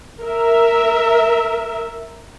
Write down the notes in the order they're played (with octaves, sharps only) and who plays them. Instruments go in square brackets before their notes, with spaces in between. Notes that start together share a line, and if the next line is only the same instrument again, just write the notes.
[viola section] A#4 E5